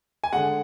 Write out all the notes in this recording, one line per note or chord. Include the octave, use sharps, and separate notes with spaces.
G#5
D3 G#3 F#5